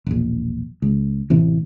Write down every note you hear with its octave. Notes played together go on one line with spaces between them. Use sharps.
E1 A#1
C#2
A1 C3 E3